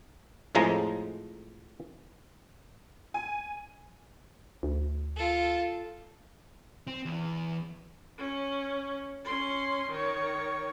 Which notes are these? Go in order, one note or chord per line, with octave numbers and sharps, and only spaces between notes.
F2 A2 F3 G#3 A#5
G#5
D2
F4 A4
C4
E2 E3
C#4
C#4 C6
D#3 C#5